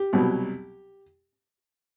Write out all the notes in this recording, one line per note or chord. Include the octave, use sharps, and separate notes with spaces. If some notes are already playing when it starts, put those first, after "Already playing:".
Already playing: G4
C2 B2 F#3